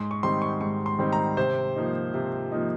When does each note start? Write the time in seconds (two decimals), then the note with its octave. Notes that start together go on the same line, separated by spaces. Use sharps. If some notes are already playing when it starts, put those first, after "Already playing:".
Already playing: G#2 C6
0.11 C#6
0.23 D#3 G3 C4 D#4 C6
0.42 C#6
0.61 G#2 C#6
0.86 C6
0.99 D#3 G3 C4 D#4
1.12 A#5
1.37 C3 C5
1.76 F3 A#3 D#4
2.14 C3
2.52 F3 A#3 D#4